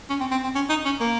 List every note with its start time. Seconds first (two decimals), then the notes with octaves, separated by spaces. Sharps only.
0.09 C#4
0.20 C4
0.31 C4
0.43 C4
0.55 C#4
0.69 D#4
0.85 C#4
1.00 A#3